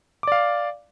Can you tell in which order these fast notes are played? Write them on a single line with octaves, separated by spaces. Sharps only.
D6 D5 F5